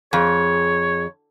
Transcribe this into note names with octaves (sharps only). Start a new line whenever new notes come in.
F2 G#4 C#5